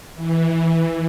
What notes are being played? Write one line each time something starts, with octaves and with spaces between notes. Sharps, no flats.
E3